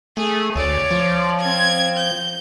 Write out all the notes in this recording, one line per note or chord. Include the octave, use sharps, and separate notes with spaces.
A3 G#4
D2 C#5 D5
F3
C4 G#6
G6